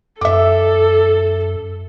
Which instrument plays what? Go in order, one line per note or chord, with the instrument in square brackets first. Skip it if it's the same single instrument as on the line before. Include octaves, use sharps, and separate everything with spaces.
[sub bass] F#2 [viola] A4 [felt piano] E5 D6